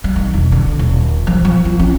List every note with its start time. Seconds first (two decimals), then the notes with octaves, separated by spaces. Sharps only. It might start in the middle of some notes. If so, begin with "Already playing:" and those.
0.04 G3
0.16 D#3
0.34 E1
0.52 D3
0.79 D#1
1.27 F3
1.45 F3
1.65 F4
1.80 C#4